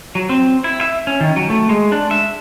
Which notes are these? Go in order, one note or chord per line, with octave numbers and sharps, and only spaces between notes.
F#3
C4
E4
E5
C#4
D#3
F#3
A3
G#3
D4
E5